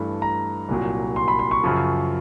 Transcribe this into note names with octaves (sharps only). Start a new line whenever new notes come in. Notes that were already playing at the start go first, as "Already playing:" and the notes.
Already playing: G2 E3 A3
A#5
C2 A#2 F#3
C6
B5
C6
C#6
F#2 C#3 F3